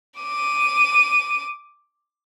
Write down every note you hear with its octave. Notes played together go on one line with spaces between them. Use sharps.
D6 D#7